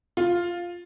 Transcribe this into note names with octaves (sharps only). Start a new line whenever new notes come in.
F4